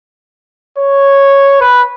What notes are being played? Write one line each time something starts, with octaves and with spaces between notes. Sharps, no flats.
C#5
B4